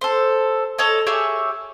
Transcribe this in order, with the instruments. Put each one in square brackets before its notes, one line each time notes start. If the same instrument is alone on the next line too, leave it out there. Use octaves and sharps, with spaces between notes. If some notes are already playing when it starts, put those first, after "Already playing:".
[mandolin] A4 C5
A4 C#5 D#5
G4 G#4 C#5 E5